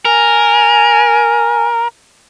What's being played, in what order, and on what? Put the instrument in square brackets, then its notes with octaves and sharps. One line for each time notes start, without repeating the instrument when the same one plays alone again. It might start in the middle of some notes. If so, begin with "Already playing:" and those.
[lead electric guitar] A#4 [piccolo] G#5